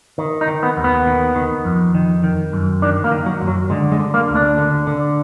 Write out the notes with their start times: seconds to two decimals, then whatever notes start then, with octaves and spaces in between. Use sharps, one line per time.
0.18 D#3
0.41 D#4
0.47 D#3
0.63 B3
0.77 D#2
0.84 B3
1.07 D#3
1.35 D#3
1.65 F2
1.95 D#3
2.24 D#3
2.53 F#2
2.82 D#3 D4
3.04 A#3
3.11 D#3
3.26 F#3
3.41 F#2
3.48 F#3
3.70 D3 G#3
3.92 G#3
3.99 D3
4.14 A#3
4.29 D2
4.35 D4
4.58 D3
4.87 D3